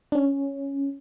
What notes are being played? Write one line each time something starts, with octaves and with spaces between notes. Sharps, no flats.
D4
C#4